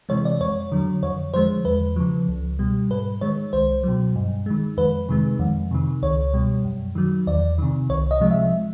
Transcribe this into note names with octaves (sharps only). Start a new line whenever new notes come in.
C3 E3 G#3 C#5
D5
F2 C#5
D3 F#3
F2 C#5
D3 F3 G#3 C5
E2 B4
C#3 F3
C#2
B2 G3
G#2 B4
D#3 G#3 C#5
C2 C5
B2 F#3
G2
D#3 G#3
F2 B4
C3 D#3 G#3
F2
C3 D#3
C#2 C#5
B2 G3
F#2
D#3 F#3
E2 D5
C3 D#3
C2 C#5
D#5
C3 F3 G#3
E5